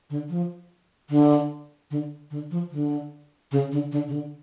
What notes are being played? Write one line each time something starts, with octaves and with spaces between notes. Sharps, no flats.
D3
F3
D3
D3
D3
F3
D3
C#3
D3
D3
C#3
D3